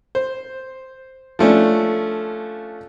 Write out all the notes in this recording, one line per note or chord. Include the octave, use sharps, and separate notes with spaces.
C5
F3 A3 C#4 D4